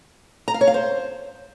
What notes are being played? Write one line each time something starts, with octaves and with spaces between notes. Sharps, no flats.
A#5
F5
C#5
F5
C5